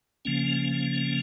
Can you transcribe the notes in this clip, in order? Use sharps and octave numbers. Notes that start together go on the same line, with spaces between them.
C#3 F3 A#3 C#4